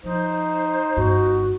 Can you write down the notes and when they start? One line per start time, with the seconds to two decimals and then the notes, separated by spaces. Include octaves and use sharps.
0.04 F3 D#4 C5
0.97 G1 G2 F#4